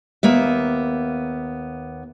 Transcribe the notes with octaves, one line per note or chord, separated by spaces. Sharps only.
D#2 A#3 B3 E5